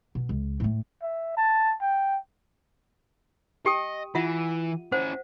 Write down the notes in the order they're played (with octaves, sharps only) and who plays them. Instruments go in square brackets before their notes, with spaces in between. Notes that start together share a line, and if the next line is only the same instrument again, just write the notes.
[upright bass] B2
C#2
A2 A3
[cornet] E5
A5
G5
[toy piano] G4 G5 D#6 [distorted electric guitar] D#5
[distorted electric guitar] E3 [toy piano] F4 E5 F#5
[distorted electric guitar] C#4 E4 [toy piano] C5 F#5